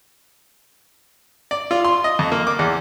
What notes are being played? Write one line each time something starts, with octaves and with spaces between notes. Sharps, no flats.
D5
F4
C6
D#5
F2
A#3
D6
E2